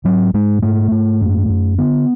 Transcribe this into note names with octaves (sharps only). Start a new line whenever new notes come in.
G#2 F#3
G#2 G#3
G#2 A3
G#2
F#2
F#2
D3 B3